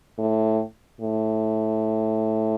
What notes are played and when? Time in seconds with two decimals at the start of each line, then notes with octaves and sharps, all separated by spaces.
0.18 A2
1.01 A2